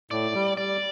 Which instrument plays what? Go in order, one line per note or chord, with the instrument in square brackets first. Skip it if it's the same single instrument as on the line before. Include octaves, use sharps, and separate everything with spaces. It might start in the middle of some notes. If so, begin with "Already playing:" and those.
[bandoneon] A2 [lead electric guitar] D5
[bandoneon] G3
[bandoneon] G3 [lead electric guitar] D5